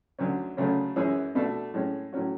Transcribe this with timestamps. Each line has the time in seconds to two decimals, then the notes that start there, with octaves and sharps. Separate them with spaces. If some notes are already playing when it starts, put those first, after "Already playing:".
0.19 D2 D3 F#3 C#4
0.57 D2 C#3 F#3 A3 C#4
0.96 F#2 E3 G#3 C#4 G#4
1.35 B2 A3 D4 F#4 A4
1.74 A2 G#3 C#4
2.13 A2 F#3 C#4 F#4